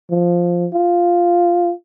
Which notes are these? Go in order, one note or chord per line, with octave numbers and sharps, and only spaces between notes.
F3
F4